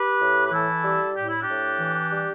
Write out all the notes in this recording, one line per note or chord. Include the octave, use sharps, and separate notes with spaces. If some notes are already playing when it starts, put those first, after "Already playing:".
Already playing: G4 B4
A2
B4
E3 E4 A4
G3
A2 G4
E4
D4 G4
A2
E3
G3